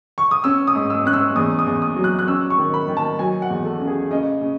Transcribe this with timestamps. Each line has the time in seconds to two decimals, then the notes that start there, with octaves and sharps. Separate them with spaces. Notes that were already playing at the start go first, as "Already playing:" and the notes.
0.18 C#6
0.31 D#6
0.44 C#4 E6
0.67 D#6
0.75 G#2
0.90 E6
1.05 C#4 F#6
1.13 E6
1.36 E2 D#6
1.59 D#6
1.66 E2
1.82 D#6
1.96 F#3
2.04 F#6
2.19 F#6
2.28 C#4 E6
2.50 C#6
2.58 D#3
2.74 B5
2.88 D#3
2.97 A5
3.19 F#3 G#5
3.42 F#5
3.50 E2
3.65 A4
3.80 C#3
3.87 G#4
4.11 C#3 D#5
4.41 C#3